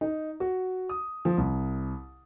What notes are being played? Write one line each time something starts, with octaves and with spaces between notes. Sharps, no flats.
D#4
F#4
D#6
F3
C2